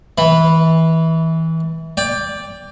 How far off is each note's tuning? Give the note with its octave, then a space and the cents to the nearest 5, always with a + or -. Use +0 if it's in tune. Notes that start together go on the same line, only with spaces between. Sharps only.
E3 -25 B5 +0
D5 -10 G5 +20